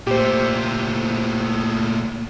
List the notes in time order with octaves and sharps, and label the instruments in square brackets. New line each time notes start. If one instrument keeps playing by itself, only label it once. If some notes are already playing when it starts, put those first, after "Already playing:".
[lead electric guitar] A#2 A3 [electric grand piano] G4 C5